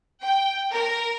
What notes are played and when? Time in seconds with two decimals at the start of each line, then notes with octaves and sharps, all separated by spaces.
0.22 G5
0.72 A#4